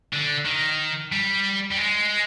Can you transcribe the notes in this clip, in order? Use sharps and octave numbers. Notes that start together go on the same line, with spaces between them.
D3
D#3
G3
G3
G#3